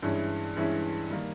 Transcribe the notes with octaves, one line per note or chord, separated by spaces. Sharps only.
G2 E3 G#3 C#4 E4
G2 E3 G#3 C#4 E4
D#3 G3 A#3